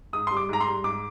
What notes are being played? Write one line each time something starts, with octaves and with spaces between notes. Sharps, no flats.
G#2 D#6
G3 C6
D6
G#2 A#5
C6
G3
G#2 D6